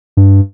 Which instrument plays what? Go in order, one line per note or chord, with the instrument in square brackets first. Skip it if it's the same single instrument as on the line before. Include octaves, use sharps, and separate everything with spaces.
[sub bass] G2